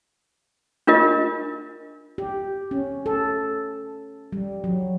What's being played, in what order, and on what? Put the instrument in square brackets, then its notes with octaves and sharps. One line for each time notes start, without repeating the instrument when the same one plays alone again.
[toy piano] D4 F4 A#4 D#5
[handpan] G4
C#4
A4
G3
F#3